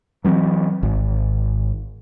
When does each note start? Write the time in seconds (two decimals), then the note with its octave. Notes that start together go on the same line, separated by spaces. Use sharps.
0.24 E3 F#3 B3 C4
0.83 G#1